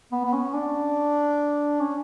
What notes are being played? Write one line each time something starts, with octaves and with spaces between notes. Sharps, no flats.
B3
B3
C#4
D4
C#4